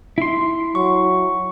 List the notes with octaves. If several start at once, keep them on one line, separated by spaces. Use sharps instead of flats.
E4 C6
F#3 C#6